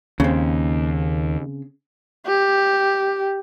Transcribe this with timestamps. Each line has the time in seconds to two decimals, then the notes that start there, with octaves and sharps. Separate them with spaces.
0.20 D#2 C#3 C4
2.26 G4